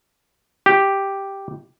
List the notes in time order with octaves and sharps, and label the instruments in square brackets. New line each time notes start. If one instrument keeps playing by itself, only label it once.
[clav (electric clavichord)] G4